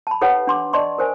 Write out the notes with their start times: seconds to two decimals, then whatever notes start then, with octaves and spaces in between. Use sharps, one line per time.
0.07 A5 B5
0.21 D#4 G4 A4 B4 C#5 F#5
0.47 D4 C6 D6
0.73 D5 D#5 A5 C6 C#6
0.98 A#4 C5 G#5